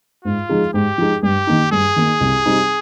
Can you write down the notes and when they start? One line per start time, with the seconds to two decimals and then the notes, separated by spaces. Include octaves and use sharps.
0.24 G#2 F4
0.49 F3 G#3 D#4 G#4
0.74 G#2 G4
0.98 F3 G#3 D#4 G#4
1.23 G2 G4
1.47 D#3 A#3 D#4
1.72 G2 G#4
1.96 D#3 A#3 D#4
2.21 C2
2.46 C3 G3 C4 D#4